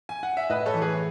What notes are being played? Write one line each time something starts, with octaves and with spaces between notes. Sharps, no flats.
G#5
F#5
E5
A2 B4 D#5
A4 C#5
E3
G#4 B4